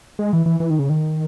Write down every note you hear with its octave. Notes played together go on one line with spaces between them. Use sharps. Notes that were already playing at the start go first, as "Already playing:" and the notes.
G#3
E3
E3
E3
D#3
C#3
D#3